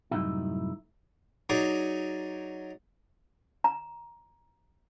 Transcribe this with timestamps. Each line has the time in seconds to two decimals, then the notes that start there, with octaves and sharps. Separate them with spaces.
0.11 C2 F#2 A2 C3 D#4 E4
1.49 F#3 D#4 G#4 D5 D6
3.64 A#5